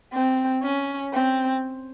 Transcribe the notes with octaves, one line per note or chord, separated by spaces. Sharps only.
C4
C#4
C4